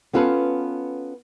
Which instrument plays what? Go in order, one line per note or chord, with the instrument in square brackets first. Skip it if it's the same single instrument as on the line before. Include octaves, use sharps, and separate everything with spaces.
[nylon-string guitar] B3 C#4 F4 A4 B4